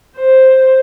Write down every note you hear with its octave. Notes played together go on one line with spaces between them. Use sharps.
C5